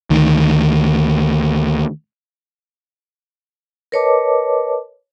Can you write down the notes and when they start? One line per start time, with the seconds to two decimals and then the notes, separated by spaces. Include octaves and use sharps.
0.10 D2 D#3
3.92 A#4 B4 C#5 D#5 A5 D6